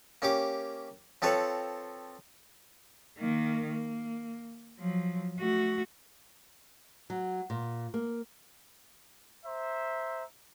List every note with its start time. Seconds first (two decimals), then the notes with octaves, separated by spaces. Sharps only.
0.22 A#3 C#4 G4 D6
1.22 F3 C4 A4 B4 C#5
3.18 D#3 A#3
3.70 A#3
4.79 F3 F#3
5.38 A3 F#4
7.10 F#3
7.50 A#2
7.94 A#3
9.45 C5 E5 A#5